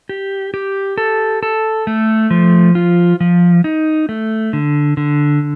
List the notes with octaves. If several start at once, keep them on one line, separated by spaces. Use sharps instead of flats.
G4
G4
A4
A4
A3
F3
F4
F3
D#4
A3
D3
D3